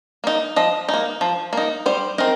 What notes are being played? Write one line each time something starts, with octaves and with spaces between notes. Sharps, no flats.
A#3 D#4
F3 D#5
A#3 D#4
F3
A#3 D#4
G3 C5
C4 D#4 A#4